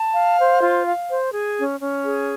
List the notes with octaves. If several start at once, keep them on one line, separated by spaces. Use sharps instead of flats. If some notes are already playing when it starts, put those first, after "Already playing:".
Already playing: A5
F5
C5
F4
F5
C5
G#4
C#4
C#4
G#4